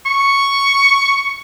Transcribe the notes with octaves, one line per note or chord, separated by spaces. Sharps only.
C#6